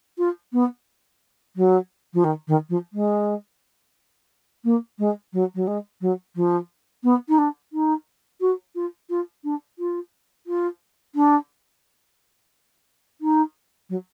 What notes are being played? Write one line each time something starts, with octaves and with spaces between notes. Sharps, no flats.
F4
B3
F#3
F3
D#3
D#3
F3
G#3
A#3
G#3
F#3
F#3
G#3
F#3
F3
B3
D#4
D4
D#4
F#4
F4
F4
D4
F4
F4
D4
D#4
F#3